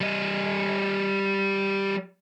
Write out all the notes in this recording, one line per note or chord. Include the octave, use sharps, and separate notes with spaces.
G3 D#5